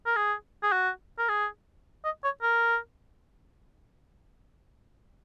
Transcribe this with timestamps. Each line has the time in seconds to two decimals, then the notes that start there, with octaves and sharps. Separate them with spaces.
0.06 A#4
0.16 G#4
0.63 G#4
0.72 F#4
1.18 A#4
1.29 G#4
2.05 D#5
2.24 C#5
2.42 A#4